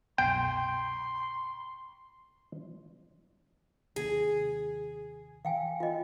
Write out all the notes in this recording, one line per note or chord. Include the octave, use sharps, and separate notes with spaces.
C2 F#2 B2 G5 C6
D#2 C3 A#3 G#4
E3 F5 G5 G#5
F4 D#5